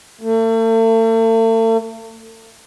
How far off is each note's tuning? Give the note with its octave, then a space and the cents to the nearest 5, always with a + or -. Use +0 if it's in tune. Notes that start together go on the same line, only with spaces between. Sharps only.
A3 +40